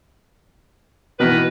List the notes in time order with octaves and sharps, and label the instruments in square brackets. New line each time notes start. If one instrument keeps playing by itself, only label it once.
[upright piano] B2 E3 [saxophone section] D#3 A#4 B4